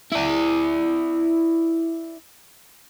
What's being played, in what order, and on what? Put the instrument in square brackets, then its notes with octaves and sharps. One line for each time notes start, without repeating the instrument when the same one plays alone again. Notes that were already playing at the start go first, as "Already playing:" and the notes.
[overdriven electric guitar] E4 D5